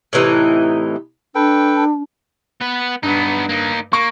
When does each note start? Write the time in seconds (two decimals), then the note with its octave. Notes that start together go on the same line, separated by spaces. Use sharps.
0.13 A2 C3 E3 D#4
1.35 D4 A4 B4 G5
2.61 B3 B4
3.03 G2 B3 D#4
3.49 A#3 D#4
3.93 A#3 C#6